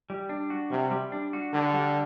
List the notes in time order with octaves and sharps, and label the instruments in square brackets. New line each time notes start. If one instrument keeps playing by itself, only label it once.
[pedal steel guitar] G3
D4
F#4
[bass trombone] C3 [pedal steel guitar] G3
[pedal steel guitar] G3
D4
F#4
[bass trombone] D3 [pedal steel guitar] G3
[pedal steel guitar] G3